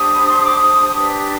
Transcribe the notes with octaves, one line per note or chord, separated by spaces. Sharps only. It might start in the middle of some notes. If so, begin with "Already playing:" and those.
Already playing: D4 G4 C5 D#6
B5
C6
D6
D#6
D4 G4 B4